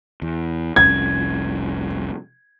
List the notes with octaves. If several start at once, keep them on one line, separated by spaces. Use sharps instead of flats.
E2
F1 C2 C#4 G#6